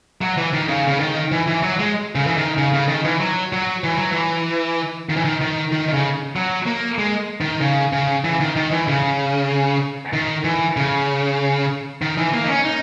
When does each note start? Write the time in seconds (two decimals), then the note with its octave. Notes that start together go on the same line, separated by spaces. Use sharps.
0.21 F#3
0.37 E3
0.53 D#3
0.68 C#3
0.88 C#3
1.00 D#3
1.32 E3
1.48 E3
1.63 F#3
1.79 G#3
2.15 C#3
2.27 E3
2.37 D#3
2.58 C#3
2.73 C#3
2.88 D#3
3.05 E3
3.20 F#3
3.53 F#3
3.84 E3
3.96 F#3
4.11 E3
5.09 D#3
5.17 E3
5.25 D#3
5.41 D#3
5.72 D#3
5.88 D#3
5.94 C#3
6.36 F#3
6.66 A#3
6.99 G#3
7.41 D#3
7.61 C#3
7.93 C#3
8.24 E3
8.40 D#3
8.56 D#3
8.71 E3
8.88 C#3
10.13 D#3
10.44 E3
10.77 C#3
12.02 D#3
12.17 E3
12.33 A#3
12.44 D#4
12.49 C#4
12.65 D#4